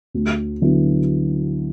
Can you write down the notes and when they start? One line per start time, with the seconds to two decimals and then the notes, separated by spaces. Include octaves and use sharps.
0.14 D2
0.61 D3 F#3 B3 E4